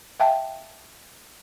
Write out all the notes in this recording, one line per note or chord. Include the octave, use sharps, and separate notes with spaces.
E5 F5 G5 A5